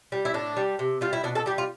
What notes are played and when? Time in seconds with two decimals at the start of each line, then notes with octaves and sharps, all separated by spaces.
0.12 G3
0.25 E4
0.34 A2 D4
0.57 G3
0.79 C3
1.01 G3 F4
1.13 E4
1.23 B2 D4
1.35 A4
1.46 G3 G4
1.58 F4